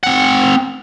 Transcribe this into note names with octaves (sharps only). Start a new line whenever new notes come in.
C4 F#5